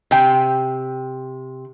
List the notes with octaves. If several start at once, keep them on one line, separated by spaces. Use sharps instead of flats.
C3 G5